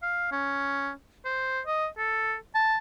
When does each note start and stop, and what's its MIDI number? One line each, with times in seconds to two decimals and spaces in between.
0.03 0.32 77
0.32 0.91 61
1.25 1.60 72
1.67 1.87 75
1.98 2.35 69
2.55 2.78 81